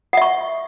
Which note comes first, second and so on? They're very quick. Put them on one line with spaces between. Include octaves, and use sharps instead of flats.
F#5 E5 C#6